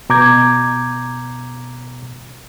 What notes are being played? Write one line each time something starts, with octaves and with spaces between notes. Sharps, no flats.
B2 A#5 D6 G6 G#6